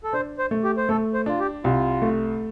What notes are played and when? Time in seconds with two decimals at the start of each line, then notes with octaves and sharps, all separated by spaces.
0.04 A4
0.13 D4 C5
0.39 C5
0.51 A3
0.64 G4
0.77 C5
0.89 A3 A4
1.14 C5
1.26 D4 F4
1.40 G4
1.64 C2 F4
2.02 A3